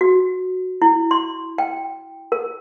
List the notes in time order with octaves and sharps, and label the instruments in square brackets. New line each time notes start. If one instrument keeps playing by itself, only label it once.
[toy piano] F#4
E4
C6
G5
A#4